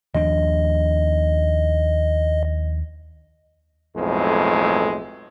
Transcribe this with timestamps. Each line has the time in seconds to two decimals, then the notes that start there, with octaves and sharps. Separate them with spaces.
0.15 D#2 F3 D4 D#5
3.96 B1 F2 A2 G#3